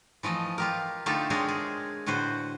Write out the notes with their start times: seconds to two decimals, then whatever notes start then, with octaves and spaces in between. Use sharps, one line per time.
0.23 E3 F3 A3 D#5
0.58 F4 G4 A#4
1.06 D3 A3 D#4 F4 G4 A4
1.30 G#3 C4 D4 G#4 A#4 C#5
1.48 G#4
2.06 A2 D3 F#4 B4 C5